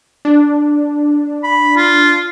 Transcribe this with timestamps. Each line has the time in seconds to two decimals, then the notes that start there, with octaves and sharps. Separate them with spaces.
0.25 D4
1.43 B5
1.77 F4